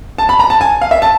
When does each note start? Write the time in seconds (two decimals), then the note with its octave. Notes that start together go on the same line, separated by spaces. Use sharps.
0.18 A5
0.29 B5
0.40 A#5
0.50 A5
0.61 G#5
0.81 F5
0.91 E5
1.02 A5